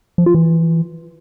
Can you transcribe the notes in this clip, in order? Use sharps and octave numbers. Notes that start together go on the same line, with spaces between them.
F3
F4
E3